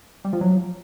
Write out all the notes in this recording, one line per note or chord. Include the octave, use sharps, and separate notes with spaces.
G3
F3
F#3